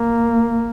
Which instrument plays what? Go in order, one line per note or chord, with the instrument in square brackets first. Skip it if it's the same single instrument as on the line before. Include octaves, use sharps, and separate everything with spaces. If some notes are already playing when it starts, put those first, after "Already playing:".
Already playing: [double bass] A#3